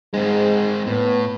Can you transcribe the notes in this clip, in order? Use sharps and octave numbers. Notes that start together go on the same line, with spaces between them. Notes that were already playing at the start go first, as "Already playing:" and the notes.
G#2 G#3 C4
A2 B3